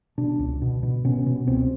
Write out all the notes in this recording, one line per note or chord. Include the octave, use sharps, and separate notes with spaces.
B2 D4
C#2
B2
B2
B2 C#4
B2
C#2 C4